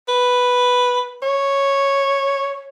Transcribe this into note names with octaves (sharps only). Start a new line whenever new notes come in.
B4
C#5